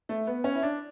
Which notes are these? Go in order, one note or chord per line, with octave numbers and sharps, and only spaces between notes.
A3
B3
C#4
E4
D4